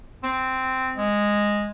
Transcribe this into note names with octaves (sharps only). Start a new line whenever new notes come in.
C4
G#3